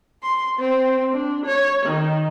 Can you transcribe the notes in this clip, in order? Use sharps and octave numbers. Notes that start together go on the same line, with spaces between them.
C6
C4
D4
C#5
D#3